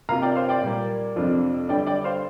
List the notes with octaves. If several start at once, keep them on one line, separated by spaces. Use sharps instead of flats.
C3 A#3 F4 F5 A#5
D5 G5
C5 F5
D5 G5
A#2 G3 A#3
F2 C3 F3 D4 F4
G2 D3 G3 D5 G5
D5 G5
C5 F5